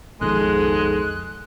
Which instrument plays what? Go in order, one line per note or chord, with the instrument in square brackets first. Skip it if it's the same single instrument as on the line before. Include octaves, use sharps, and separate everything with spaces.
[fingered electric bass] B1 F2 D#3 [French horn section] G#2 G#4 A4 [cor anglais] G#3 [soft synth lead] F#6